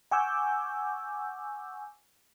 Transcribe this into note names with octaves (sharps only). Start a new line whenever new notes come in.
F#5 G#5 C#6 D6 E6 G6